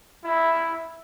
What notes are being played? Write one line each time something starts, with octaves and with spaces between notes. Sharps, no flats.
E4